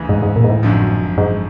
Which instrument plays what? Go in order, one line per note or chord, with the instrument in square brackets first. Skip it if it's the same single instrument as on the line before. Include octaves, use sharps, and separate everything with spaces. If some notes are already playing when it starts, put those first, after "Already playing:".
Already playing: [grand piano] D2 C#3 E3
[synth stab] G#2
G#2
A#2
G#2
A2
[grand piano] G#1 F#2 D3 F3
[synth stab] G#2